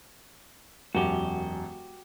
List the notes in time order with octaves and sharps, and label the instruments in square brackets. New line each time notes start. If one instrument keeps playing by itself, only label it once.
[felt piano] E1 F#2 [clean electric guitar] F#4 G4